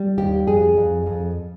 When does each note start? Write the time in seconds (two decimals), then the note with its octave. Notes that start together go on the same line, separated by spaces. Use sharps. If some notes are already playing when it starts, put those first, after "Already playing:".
Already playing: G3
0.18 D#2 G4
0.47 F2 G#4
0.77 F2
1.06 F2